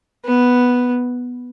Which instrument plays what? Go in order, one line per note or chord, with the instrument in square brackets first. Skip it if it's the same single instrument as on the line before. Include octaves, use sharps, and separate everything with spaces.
[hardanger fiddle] B3